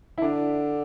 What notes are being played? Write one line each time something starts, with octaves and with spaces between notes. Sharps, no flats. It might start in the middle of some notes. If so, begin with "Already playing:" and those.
E4
D3 D4